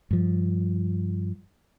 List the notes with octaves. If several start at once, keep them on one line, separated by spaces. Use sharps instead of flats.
G2 F3